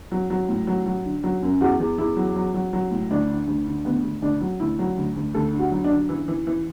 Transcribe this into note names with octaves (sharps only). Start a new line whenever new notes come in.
F#3
F#3
A2
F#3
F#3
D3
F#3
F#2
E2 F#4
E2
E2 E4
F#3
F#3
F#3
F#3
A2
D2 D4
D3
D2
D3
D2 B3
D2
D2 D4
F#3
D2 E4
F#3
D2
D2
D2 A4
D3
F#4
F#3
D4
D3
E3 E4
E3
E3